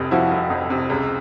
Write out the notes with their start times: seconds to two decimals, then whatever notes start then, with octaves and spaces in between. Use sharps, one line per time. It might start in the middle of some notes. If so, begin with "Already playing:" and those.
Already playing: F1 F2 C3
0.11 F3 E4 F#4
0.31 F1
0.50 F2
0.70 C3
0.90 C#2